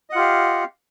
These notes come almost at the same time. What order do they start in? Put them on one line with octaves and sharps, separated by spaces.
D#5 F#5 F4 G4 F5